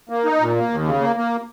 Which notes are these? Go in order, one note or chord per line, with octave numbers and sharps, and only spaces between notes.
A#3
D#4
A#2
A#3
D#2
C#3
A#3
A#3